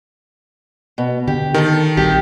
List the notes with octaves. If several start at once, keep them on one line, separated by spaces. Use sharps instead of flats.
B2
D3 G4
D#3 A4 A#4
A#1 G3 C4 G4